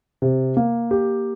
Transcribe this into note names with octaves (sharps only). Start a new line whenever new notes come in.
C3
A#3
G4